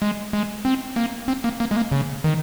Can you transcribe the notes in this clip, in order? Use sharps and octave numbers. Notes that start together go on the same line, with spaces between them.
G#3
G#3
C4
A#3
C4
A#3
A#3
G#3
A#3
C#3
D#3